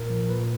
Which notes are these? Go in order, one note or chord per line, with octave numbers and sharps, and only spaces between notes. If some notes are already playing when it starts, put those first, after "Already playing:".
Already playing: A#2 A#4
F3
A#2 B4